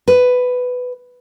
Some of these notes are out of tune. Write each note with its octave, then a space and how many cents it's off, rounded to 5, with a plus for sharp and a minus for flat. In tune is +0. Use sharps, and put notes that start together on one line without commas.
B4 +10